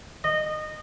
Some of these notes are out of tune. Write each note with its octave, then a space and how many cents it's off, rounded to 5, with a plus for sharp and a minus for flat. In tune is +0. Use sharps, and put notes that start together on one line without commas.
D#5 -20